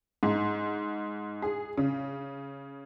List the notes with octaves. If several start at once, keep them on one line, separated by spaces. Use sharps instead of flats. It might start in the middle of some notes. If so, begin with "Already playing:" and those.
G#2
G#4
C#3